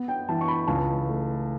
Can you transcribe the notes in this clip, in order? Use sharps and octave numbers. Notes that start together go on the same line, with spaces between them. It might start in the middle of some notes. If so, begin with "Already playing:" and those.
Already playing: B3
G5
E3 A5
C#6
B5
C#2 A5
A3